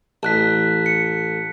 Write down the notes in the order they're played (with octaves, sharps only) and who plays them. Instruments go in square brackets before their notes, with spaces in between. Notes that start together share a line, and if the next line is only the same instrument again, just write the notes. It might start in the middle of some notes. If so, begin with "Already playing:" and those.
[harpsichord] A1 [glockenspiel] A5 F#6 B6
[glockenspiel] C#7